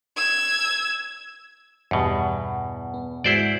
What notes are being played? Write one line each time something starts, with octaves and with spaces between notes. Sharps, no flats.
E6 G#6
E2 G2 B2 E3 G3
B3
G#2 G#3 E4 F#4 C5 D5